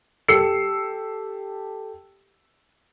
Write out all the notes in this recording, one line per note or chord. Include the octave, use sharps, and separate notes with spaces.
G4 A4 E6 C7 C#7